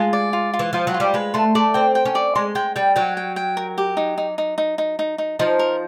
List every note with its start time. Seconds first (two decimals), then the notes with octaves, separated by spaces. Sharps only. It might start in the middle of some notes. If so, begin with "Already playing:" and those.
Already playing: G#3 F4
0.13 D5
0.33 F4
0.54 F4
0.59 E3
0.73 F3 F4
0.87 F#3
0.94 F4
1.00 G3
1.14 G#3 B4
1.34 A3 C6
1.55 A3 D5
1.74 C4 G5
1.95 G5
2.05 C#4
2.15 D5
2.36 G#3 C6
2.55 G#3 G5
2.76 G3 G5
2.96 F#3 G5
3.17 G5
3.36 G5
3.57 A#4
3.78 G4
3.97 D#4
4.18 D#4
4.38 D#4
4.58 D#4
4.78 D#4
4.99 D#4
5.18 D#4
5.39 F3 D#4
5.59 A#4